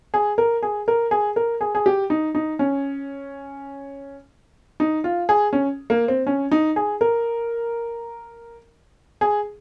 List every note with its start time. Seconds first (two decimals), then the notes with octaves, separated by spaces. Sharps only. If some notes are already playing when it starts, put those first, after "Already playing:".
0.14 G#4
0.38 A#4
0.63 G#4
0.88 A#4
1.11 G#4
1.36 A#4
1.61 G#4
1.75 G#4
1.86 G4
2.10 D#4
2.35 D#4
2.59 C#4
4.80 D#4
5.04 F4
5.29 G#4
5.53 C#4
5.90 A#3
6.08 C4
6.27 C#4
6.52 D#4
6.76 G#4
7.01 A#4
9.21 G#4